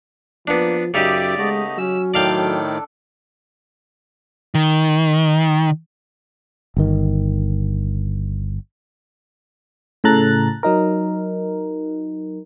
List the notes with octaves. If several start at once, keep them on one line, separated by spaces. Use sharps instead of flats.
F3 A#3 B3 D4
F#2 C#3 D#4 G4 D5 E5 G5 D6
G#3 A3 B3 D#5
F#3 C#4 E6
A2 D#3 D4 A4 D5 F5 G5
D#3
G1 D#3
A2 C#3 A4 A#5 F#6 A6
F#3 D#4 A#4